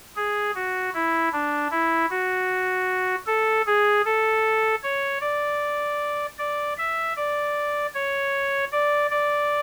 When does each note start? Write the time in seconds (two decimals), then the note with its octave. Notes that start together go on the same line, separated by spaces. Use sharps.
0.16 G#4
0.55 F#4
0.94 E4
1.32 D4
1.71 E4
2.10 F#4
3.26 A4
3.66 G#4
4.05 A4
4.83 C#5
5.21 D5
6.38 D5
6.78 E5
7.16 D5
7.94 C#5
8.72 D5
9.11 D5